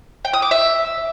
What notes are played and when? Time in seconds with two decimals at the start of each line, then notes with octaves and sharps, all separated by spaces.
0.25 G5
0.33 D#6
0.42 D6
0.51 E5